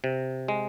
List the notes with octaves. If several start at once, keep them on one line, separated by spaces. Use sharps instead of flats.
C3
G#3